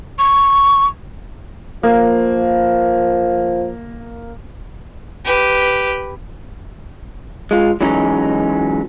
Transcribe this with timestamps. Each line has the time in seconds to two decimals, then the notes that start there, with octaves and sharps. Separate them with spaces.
0.19 C#6
1.83 F3 A#3
5.25 G4 B4
7.51 G#3 F4
7.81 E3 F#3 G#3 C#4 D#4